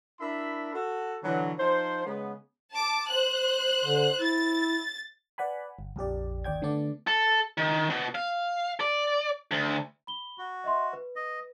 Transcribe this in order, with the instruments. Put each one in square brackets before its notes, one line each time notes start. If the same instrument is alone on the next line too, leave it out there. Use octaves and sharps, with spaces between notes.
[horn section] D4 E4 A#4 E5 B5
F#4 A4
B2 D3 E3 F#3
F3 D#4 C5
C#3 G#3 B3
[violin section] A5 D6
C5 F#6
[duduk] D3
[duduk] E4 [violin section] A6
[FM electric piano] B4 D5 F#5 G#5 B5
G1
A#1 F2 G4 D5
G1 D#2 D5 G5 G#6
D3 A3 B3 D4 D5
[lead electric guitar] A4
D#3
B2
F5
D5
D2
[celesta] B5 G7
[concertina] F#4
[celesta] D#5 E5 C6
B4
[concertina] D#5